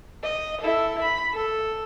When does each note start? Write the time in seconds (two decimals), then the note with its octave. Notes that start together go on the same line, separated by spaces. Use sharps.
0.23 D#5
0.62 E4 A4
1.03 B5
1.34 A4